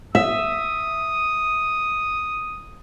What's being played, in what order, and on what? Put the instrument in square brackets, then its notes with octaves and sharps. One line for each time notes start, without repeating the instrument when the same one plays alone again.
[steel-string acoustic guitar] E5 [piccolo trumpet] D#6